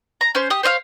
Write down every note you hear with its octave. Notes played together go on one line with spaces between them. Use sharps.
A#5
C#4 C5
G4 D#6
C5 C#5 D#5 F5